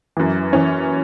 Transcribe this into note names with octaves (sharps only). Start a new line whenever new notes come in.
F#2 E3
E3 C#4